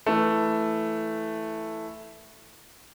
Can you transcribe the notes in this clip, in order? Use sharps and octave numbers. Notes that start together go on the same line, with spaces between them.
E3 A3